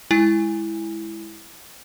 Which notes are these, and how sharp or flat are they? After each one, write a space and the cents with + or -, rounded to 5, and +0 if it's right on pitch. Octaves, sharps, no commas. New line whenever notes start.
G#3 +0 E4 +0 G#5 -20